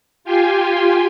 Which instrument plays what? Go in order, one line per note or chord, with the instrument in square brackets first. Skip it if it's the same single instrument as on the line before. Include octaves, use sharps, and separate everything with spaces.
[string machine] F4 G4 G5 G#5 C6